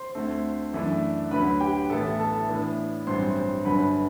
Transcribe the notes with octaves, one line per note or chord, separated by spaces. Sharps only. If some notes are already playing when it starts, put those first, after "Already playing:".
Already playing: C5 C6
D2 D3 A3 C4
F#2 E3 A3 D4
D2 D3 F#3 B4 B5
G4 G5
A1 A2 E3 B3 A4 A5
A4 A5
A2 E3 B3 D4
A1 G2 F#3 C4 C5 C6
C5 C6
G1 G2 D3 F#3 B4 B5